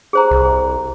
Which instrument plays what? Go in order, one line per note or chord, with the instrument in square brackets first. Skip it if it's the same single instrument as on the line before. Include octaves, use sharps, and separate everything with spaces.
[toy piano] G#4 C5 A#5
[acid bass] C2